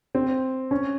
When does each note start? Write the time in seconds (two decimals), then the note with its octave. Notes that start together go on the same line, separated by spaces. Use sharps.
0.15 C4
0.71 C#4